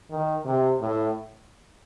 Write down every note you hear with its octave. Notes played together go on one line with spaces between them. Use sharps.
D#3
C3
A2